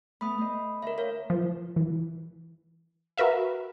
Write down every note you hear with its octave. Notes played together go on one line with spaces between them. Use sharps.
A3 B3 B5 D#6
A3 C5 D#5
D2 A#4 E5
A#4 C#5 F5
F3
E3
F#4 A#4 B4 E5 F5